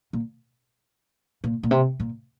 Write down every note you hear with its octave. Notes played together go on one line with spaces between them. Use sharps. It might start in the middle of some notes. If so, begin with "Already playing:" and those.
A#2
A#2
A#2
C3
A#2